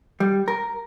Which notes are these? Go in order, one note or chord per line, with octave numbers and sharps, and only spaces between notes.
G3
A#4